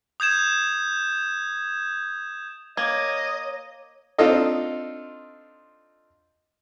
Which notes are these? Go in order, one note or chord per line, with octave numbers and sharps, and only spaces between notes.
D#6 G6 G#6 E7
A#3 C#5 D#5 D6 G#6
C4 D4 D#4 F4 A4 D#5